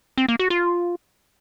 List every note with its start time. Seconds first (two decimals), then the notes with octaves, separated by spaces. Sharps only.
0.18 C4
0.28 A#3
0.39 F#4
0.50 F4